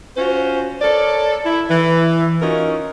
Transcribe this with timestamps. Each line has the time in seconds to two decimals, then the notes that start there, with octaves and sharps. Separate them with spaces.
0.17 C#4 F4 F#4 C5
0.82 A4 A#4 C#5 D5
1.46 E4
1.70 E3
2.42 C#4 D#4 F4 F#4 A#4